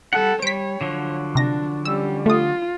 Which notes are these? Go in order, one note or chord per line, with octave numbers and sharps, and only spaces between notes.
G3 A4 F#5
G3 C#5 B6 D7
D3 F3 F#3
C3 D4 A#6
G3 C#4 E6
A3 F4 D#6